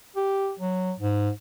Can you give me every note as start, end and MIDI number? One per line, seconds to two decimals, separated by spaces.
0.16 0.52 67
0.59 0.93 54
0.99 1.30 44